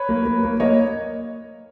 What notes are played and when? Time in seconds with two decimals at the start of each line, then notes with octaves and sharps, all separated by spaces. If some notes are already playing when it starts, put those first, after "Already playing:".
Already playing: B4 C#5
0.09 A#3
0.25 A#3
0.43 A#3
0.60 A#3 C#5 D#5